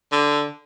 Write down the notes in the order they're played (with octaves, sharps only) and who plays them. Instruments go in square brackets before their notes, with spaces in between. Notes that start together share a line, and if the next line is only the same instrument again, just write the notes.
[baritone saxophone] D3